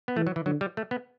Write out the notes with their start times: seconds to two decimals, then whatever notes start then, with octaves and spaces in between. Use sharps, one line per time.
0.08 B3
0.16 E3 A3
0.27 F#3
0.36 E3
0.46 D3 F#3
0.61 G3
0.77 A3
0.91 B3